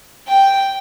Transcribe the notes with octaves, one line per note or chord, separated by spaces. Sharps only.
G5